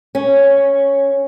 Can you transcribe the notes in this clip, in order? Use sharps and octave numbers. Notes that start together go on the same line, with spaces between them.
C#4